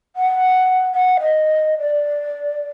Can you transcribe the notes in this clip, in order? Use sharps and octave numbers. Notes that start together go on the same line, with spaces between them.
F#5
F#5
D#5
D5